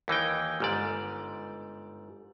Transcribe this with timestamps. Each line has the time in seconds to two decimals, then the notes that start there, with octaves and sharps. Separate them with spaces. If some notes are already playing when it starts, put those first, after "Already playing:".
0.08 D#2 E3 D#4 G5
0.60 G1 G#2 D5